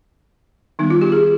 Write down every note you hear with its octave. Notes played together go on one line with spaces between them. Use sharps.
D#3 G3 B3 D#4
F4
G4
G#4